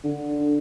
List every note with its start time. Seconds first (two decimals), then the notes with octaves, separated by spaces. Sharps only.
0.04 D3